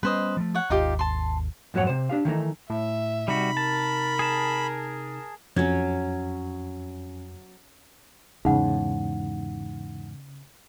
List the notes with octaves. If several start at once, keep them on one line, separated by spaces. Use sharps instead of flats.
G3 B3 C#4 B4 C5 D#5
F3 G3 A3
C#5 F#5
G#1 D#2 D#4 F4 G4
A5 C6
F2 G#2 F#3 E4 C#5 F#5
C3 C5
D4 G4 F5
D#3 E3 A3 D#4
A2 E5
C3 G3 D#4 F#4 B5
A#4 A5
G#4 A5
F2 F#3 C#4 G#6
E2 G#2 C#3 D#4 F#5